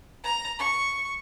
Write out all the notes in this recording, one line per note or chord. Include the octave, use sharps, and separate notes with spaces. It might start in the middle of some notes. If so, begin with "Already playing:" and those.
A#5
C#6